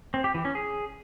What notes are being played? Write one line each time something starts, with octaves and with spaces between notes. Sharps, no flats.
C4
G4
E3
C#4
G#4